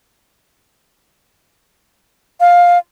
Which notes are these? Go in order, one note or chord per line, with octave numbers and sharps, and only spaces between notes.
F5